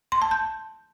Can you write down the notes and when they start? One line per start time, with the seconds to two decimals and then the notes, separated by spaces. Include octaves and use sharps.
0.12 C6
0.22 A5
0.31 G6